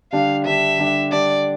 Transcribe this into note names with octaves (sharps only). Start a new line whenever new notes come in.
D3 G3 D4 G4 F5
D3 G3 D4 G4 E5
D3 G3 D4 G4
D3 G3 D4 G4 D5